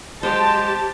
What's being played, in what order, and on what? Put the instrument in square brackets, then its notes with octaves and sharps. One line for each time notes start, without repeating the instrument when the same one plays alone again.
[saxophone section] F#3 G#3 [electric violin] G4 [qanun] C5 [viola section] A5